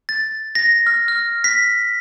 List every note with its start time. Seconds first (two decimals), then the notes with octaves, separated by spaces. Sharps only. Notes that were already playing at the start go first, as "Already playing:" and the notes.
0.09 A6
0.55 A#6
0.87 F6
1.08 F6
1.44 B6